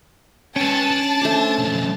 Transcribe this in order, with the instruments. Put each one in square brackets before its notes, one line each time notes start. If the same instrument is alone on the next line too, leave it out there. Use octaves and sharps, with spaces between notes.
[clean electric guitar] C#4 [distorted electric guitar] B4 G5 [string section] A5
[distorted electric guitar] D4
[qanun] A3 C5 D6
[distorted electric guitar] B1 F2